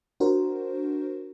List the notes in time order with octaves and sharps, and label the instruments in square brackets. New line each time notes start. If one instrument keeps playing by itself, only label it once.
[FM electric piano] D4 F#4 A#4 C5